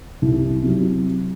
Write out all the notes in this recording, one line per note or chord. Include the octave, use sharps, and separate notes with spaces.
C2
C3 F#3